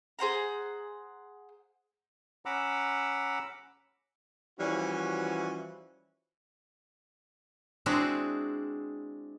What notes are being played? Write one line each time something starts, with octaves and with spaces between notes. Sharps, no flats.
G#4 C5 F#5 A#5
C#4 F#5 A#5 B5 D6 E6
E3 F3 G3 C#4 F#4
G#3 C4 D4 E4 F#4 G#4